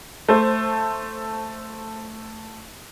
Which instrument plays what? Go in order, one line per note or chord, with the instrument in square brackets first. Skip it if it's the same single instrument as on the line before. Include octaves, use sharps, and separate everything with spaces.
[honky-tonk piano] A3 C5